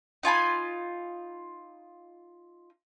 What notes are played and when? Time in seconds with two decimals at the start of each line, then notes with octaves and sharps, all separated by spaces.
0.23 D#4 F4 G#5 B5